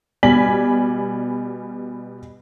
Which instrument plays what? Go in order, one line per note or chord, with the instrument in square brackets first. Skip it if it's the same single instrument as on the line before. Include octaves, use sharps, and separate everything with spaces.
[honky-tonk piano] B2 G3 D5 G#5 B6 F#7